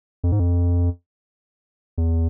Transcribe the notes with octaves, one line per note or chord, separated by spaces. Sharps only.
F2
G#2
F2
E2